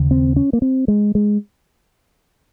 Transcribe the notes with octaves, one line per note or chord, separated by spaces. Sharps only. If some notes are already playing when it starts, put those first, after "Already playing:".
Already playing: D#2 C#3
C4
C#4
A#3
C4
G#3
G#3